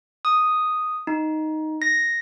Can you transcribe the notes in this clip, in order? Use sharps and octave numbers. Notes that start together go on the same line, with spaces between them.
D#6
D#4
A#6